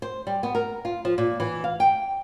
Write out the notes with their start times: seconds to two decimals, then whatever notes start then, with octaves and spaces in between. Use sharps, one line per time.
0.02 C5
0.27 G3
0.43 B3
0.55 A#4
0.85 F4
1.05 F3
1.18 A#2
1.40 E3
1.64 F5
1.80 G5